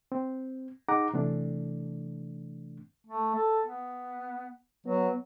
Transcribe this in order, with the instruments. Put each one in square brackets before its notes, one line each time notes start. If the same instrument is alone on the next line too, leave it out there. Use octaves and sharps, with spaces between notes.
[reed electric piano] C4
D#4 G#4 F#5 A#5 D6
C3 E3 A3 D4
[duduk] A3
A4
B3
[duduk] F#3 [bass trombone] B3